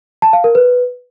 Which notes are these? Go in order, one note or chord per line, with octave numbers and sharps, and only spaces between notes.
A5
F5
A#4
B4